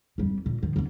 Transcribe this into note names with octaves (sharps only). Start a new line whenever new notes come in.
F2 G3
A#2
D#3 F3
E2 C3